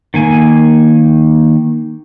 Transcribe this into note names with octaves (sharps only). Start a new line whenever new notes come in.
D#3 A#3 G#5